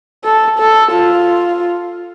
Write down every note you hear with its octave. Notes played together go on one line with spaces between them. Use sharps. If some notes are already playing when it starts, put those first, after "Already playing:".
A4
A4
F4